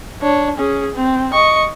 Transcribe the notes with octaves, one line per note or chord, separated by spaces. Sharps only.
D4 C#5
C#4 G#4
C4
D#5 C#6